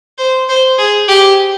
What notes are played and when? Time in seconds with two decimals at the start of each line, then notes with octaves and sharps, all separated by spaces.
0.18 C5
0.49 C5
0.78 G#4
1.08 G4